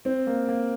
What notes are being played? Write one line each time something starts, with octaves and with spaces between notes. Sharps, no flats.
C4
A#3
A#3